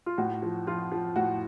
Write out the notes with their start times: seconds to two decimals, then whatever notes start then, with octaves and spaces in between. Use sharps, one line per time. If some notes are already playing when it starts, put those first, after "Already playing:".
0.06 F4
0.18 A2 F#4
0.42 F3
0.67 F3 F4
0.92 F3
1.16 A2 F#4